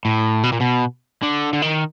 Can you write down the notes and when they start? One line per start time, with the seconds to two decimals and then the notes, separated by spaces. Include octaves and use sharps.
0.05 A2
0.44 B2
0.53 A#2
0.61 B2
1.23 D3
1.53 D3
1.62 D#3